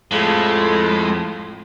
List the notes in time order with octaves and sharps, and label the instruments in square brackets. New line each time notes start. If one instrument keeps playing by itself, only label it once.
[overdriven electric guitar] F2 F3 [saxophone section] A2 [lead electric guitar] G#3